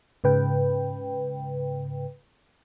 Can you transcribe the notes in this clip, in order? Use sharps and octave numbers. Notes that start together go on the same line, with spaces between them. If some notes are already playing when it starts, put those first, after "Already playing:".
G#2 C#3 B4 G5